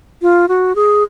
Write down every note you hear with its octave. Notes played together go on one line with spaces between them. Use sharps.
F4
F#4
G#4